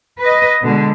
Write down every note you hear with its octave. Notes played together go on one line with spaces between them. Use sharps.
B4 D#5
B2 D3 G#3